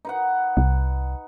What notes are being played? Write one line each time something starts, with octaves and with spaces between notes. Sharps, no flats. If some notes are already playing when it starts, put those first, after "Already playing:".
D#4 B4 F#5
C2